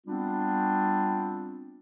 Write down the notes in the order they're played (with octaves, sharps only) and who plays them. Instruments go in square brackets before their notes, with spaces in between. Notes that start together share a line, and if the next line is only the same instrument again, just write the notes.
[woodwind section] G3 B3 C4 D4 F4